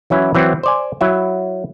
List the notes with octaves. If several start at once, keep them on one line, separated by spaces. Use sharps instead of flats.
E3 F#3 C#4 E4
E3 F#3 C4
C5 D5 G#5
F#3 E4 E5